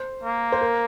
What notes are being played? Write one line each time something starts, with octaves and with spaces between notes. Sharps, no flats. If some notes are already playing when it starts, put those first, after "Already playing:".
Already playing: C5
A#3
C5
A#4